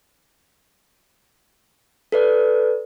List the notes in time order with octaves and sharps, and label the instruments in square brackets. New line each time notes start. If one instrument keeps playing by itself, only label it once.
[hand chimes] A4 B4 D5